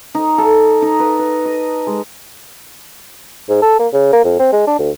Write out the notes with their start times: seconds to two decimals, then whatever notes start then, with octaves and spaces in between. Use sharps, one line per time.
0.15 D#4
0.38 A4
0.82 D#4
1.00 B4
1.19 B4
1.45 D#5
1.87 G#3
3.49 G#2
3.62 A4
3.79 A#3
3.93 C#3
4.13 A#3
4.24 F2
4.39 C4
4.53 G#3
4.68 D4
4.79 D2